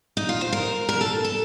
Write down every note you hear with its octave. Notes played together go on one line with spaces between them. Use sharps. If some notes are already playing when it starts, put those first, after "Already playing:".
D#4
F4
C5
A#4
A#4
A4
A4